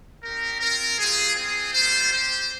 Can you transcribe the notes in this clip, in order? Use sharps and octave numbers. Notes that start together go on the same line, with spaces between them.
C4 D#4 G4 A#4
C4 F4 A#4
G3 C4 F4 G#4
C4 F4 G#4
G3 A#3 F4 C5
C4 G4 C5